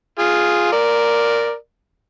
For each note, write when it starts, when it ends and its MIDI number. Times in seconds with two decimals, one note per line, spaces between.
0.19 0.69 65
0.19 0.69 68
0.72 1.54 70
0.72 1.54 74